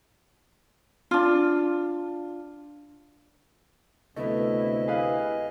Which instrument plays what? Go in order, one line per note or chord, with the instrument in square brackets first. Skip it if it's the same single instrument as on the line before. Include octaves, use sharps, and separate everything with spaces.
[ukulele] D4 F4
[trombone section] D2 C3 [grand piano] A3 B3 [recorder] E4 [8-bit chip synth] D#5
[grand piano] G#4 B4 F5